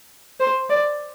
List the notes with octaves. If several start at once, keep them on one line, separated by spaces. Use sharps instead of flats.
C5
D5